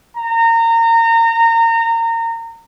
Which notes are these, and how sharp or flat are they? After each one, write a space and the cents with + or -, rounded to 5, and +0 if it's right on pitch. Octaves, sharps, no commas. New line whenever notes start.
A#5 -25